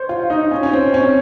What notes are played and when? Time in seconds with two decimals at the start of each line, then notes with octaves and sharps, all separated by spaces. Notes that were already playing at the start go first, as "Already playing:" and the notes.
Already playing: C5 C#5
0.09 F4
0.30 D#4
0.51 C#4
0.63 C#4
0.73 C4
0.94 C#4